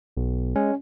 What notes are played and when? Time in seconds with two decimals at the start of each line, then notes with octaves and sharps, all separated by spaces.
0.17 B1
0.56 G#3 C#4